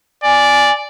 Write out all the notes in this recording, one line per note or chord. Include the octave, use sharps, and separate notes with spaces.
D5 G#5